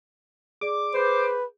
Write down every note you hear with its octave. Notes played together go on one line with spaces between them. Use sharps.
G#4 D5 D6
G#4 B4 C5 G6